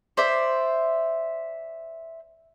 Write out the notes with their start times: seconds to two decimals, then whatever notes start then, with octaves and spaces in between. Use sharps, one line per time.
0.17 C5 D5 E5